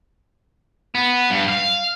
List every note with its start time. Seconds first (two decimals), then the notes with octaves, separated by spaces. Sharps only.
0.95 B3
1.31 G2
1.49 F5